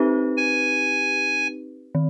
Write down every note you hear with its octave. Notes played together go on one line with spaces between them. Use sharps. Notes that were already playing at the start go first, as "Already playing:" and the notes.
Already playing: C4 D#4 G4 B4
G#5
D#3